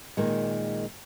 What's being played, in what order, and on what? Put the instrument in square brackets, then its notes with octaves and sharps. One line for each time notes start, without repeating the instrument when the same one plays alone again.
[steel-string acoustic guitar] A#2 D#3 G#3